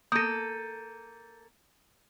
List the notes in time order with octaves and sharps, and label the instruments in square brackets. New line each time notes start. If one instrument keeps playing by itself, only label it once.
[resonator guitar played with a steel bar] A#3 A4 [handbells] D#6 A#6 [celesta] G6 D#7